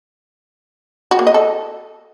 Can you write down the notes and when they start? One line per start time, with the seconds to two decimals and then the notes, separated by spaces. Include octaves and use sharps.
1.11 F#4
1.19 A#3
1.27 D#5
1.34 A4